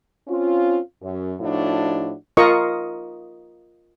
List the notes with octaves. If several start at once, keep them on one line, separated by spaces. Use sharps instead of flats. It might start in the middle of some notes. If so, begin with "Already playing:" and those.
C4 C#4 F4
F#2
A2 F3 D4 D#4 F#4
F4 A#4 D#5 C#6